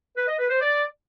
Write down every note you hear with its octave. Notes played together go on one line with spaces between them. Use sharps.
B4
D#5
B4
C5
D5